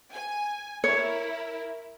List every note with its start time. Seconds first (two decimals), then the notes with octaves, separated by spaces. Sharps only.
0.12 G#5
0.84 E4 A#4 C#5